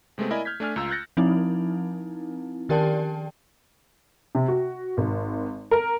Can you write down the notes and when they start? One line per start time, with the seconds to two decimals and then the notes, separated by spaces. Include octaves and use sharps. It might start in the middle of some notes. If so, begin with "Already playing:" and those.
0.18 C3 G#3 A3 B3 C4
0.31 E4 A#4 D5 D#5 G#5 B5
0.45 F6 G6 G#6 B6
0.60 A3 D4 G#5 F6
0.76 C#2 F4 A#5 E6
0.91 F#6 G6 A6 A#6 C#7
1.17 F3 C4 D#4 E4
2.69 D#3 G4 A#4 D5 G5 A5
4.35 C3
4.48 F#4
4.97 G#1
5.71 A#4